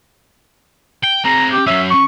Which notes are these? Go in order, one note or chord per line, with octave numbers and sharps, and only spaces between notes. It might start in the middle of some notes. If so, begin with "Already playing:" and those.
G5
C4 G#4 A#5
G4
F#3 C#4 E5
C#6